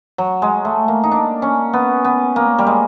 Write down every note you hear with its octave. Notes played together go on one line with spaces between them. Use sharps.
F#3
G#3
A3
A#3
D#4
D4
C#4
B3
B3
A#3
G3
G#3